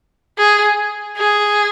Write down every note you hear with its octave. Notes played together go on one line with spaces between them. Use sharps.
G#4
G#4